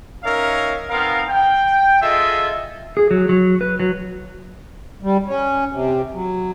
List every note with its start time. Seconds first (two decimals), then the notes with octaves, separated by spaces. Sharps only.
0.24 C#4 D#4 A#4 C#5 E5 F5
0.90 B3 C4 D#4 A#4 F5
1.28 G5
2.02 F4 G#4 A4 D#5 E5
2.97 G#4
3.11 F#3
3.29 F#3
3.61 B4
3.80 F#3
5.03 G3
5.26 C#4
5.73 C3
6.13 F#3